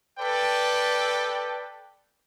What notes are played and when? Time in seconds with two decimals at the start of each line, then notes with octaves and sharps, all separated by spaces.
0.19 A4 B4 D5 G5